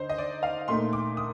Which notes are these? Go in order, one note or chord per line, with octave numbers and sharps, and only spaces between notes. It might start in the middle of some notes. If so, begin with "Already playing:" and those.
Already playing: D3 D#4 C5
D#5
D5
F5
A#2 A3 D#4 C6
D6
D#6